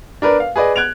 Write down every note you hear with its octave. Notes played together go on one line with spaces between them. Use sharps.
D4 A#4 B4 D5
F5
G#4 B4 D5 D#5
F#6 G#6 D7 F7